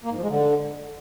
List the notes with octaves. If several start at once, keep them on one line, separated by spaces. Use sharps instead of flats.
A#3
G#2
F3
G#3
D3